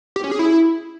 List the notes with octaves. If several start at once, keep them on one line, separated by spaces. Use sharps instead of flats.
G4
C#4
G#4
E4